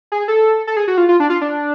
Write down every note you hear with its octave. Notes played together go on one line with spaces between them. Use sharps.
G#4
A4
A4
G#4
F#4
F4
F4
D4
F4
D4